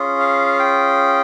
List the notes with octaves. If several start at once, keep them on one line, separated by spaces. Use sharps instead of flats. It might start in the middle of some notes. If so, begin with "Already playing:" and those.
Already playing: C#4 F4 G#4
F5
G5